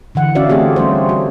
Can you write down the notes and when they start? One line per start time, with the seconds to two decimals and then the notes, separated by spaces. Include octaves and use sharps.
0.15 D3 E3 F#5
0.35 C#4 D4 F#4 D5 E5 F5
0.49 A3 C4 G4 G#4
0.76 G3 C#4 C5
1.09 F#4